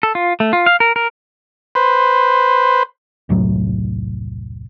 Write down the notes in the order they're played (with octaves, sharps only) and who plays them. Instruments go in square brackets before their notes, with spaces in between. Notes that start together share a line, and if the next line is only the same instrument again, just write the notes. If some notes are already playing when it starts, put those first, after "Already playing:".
[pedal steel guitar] A4
F4
A3
F4
F5
A#4
A#4
[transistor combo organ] B4 C5
[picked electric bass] E1 C2 A2 F#3